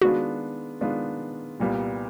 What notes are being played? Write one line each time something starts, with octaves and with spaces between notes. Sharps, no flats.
D#3 G#3 B3 D4 F4 F#4
D#3 G#3 B3 D4 F4
C2 A#2 G3 B3